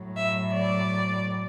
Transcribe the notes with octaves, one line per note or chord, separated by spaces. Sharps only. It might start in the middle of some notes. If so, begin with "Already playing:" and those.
Already playing: A2 F#3
E5
D5